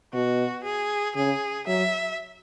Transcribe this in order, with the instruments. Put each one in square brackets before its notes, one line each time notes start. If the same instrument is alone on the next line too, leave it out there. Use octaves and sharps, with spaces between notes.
[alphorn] B2 [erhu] F#4
[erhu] G#4
[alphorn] C#3 [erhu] G#4
[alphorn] F#3 [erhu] E5